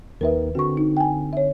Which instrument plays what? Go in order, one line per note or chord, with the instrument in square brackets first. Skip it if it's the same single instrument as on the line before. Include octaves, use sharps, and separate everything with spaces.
[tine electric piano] D#2 D#3 [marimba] A#4 B4 E5
[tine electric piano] D3 C4 [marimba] F#4 C#6
[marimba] D#4
G5 G#5
C#5 E5